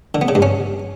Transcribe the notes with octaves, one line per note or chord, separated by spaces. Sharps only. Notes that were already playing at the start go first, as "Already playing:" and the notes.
D3
B3
C#3
G2
C#4